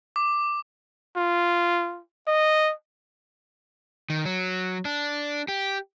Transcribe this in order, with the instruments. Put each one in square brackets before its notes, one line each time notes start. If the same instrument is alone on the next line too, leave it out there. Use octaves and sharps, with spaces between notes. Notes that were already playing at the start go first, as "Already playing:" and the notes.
[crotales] D6
[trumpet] F4
D#5
[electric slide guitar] D#3
F#3
D4
G4